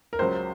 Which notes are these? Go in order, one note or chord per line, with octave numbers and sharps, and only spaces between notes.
A#4
C#2 C#3 F#3 C5